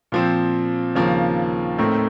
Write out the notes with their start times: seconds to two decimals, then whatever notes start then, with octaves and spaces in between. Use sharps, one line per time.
0.12 A#2 F3 C4
0.95 D#2 C#3 F3 A#3
1.78 A2 A3 C4 D#4 A#4